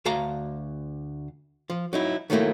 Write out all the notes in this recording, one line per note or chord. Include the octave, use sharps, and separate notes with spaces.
D2 F#4 F5 A5 A#5
F3
F#3 D#4 E4
D#3 F#3 A3 A#3 E4